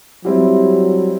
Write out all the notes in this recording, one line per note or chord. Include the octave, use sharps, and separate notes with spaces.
F#3 G3 C4 E4 G4